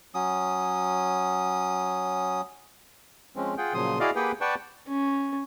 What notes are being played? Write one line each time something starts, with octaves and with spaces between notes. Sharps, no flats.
F#3 C#4 D#6
F3 G#3 C4 C#4
F4 G#4 F#5 G5
A#2 C#3 F3 F#3 C6 D#6
E4 F#4 G#4 D5 D#5 F5
A#3 G4 G#4 B4 F#5 G5
B4 D5 F#5 G5 A5 C#6
C#4